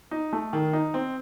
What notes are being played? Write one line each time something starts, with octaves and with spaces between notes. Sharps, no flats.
D#4
A3
D#3
D#4
C4